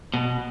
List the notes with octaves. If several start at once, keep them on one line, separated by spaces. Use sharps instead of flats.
B2